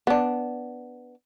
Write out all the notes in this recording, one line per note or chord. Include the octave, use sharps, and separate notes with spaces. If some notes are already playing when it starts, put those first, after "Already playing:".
B3 D4